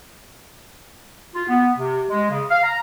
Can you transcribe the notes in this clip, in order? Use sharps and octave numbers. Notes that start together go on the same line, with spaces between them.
F4
B3
C3
G#3
C#3
F5
A#5